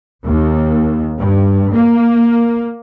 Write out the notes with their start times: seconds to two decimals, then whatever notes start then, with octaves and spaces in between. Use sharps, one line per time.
0.25 D#2
1.19 G2
1.73 A#3